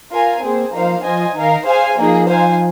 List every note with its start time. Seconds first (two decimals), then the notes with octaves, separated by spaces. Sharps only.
0.11 F4 A#4 F5 G#5
0.42 A#3 C4 G#4 C5
0.73 F3 A#3 D#4 C5 F5
1.04 F3 F4 C5 D#5 G#5
1.35 D#3 D#4 A#4 F5
1.66 G#4 C5 F5 G#5
1.97 F3 A#3 D#4 G#4
2.28 D#4 C5 F5 G#5